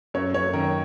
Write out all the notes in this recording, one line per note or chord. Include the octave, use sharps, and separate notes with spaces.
F#2 C#5
F#2 C#5
D#3 A#4